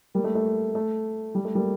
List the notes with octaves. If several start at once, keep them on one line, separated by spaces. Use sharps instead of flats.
G3 A#3
A3
A3
A3
G3
A3
G3 A#3